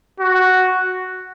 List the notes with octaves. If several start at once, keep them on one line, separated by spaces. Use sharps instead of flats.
F#4